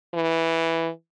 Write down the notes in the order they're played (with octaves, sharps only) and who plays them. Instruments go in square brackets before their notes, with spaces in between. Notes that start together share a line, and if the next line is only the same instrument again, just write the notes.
[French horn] E3